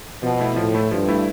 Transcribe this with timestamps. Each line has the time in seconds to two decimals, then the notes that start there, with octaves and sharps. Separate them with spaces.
0.23 B2 F3
0.40 A3 E4
0.56 A2 F3
0.75 A3 E4
0.91 G2 F3
1.08 A3 E4